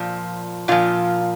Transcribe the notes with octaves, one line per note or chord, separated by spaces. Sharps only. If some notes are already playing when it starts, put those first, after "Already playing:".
Already playing: A#2 F3
A#2 F3 F4